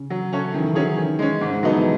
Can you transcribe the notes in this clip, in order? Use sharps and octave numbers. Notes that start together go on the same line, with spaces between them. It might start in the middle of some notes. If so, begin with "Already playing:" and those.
Already playing: C#3
F#3
C#4 F#4 A4
D#3 E3
D#3
E3 F#3 C#4 G#4
D#3
G#3 C#4
G#2
G#3
D#3 F#3 B3 D#4 A4
E3